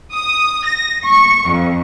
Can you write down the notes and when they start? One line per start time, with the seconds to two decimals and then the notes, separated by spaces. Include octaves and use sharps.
0.14 D#6
0.66 A#6
1.06 C#6
1.49 F2